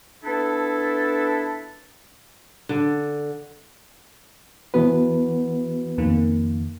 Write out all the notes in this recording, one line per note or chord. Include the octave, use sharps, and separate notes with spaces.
B3 D4 E4 A4
D3
E3 B3 F#4 B4
F2 D#3 A#3